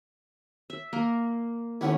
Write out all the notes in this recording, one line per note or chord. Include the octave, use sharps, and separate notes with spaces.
E5
A#3 A#4
D#2 A3 B3 C#4 E4 F#5